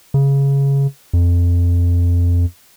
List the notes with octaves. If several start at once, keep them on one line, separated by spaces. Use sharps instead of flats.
C#3
F2